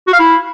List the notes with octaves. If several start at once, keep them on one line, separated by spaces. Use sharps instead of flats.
F#4
F5
E4